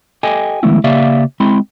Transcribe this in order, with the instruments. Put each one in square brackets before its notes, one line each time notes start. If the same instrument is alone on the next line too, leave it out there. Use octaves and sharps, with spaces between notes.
[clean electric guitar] G4 A4 D#5 G5 G#5
D#3 F3 G#3 A3 B3 E4
C#3 A#3 G4 D5 E5 F5
G#3 C4 E4 B5 C6